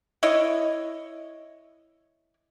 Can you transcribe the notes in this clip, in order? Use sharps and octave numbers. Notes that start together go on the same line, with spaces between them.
E4 C#5 D#5